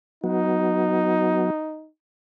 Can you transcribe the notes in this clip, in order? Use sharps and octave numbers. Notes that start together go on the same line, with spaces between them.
F#3 B3 D#4 F#4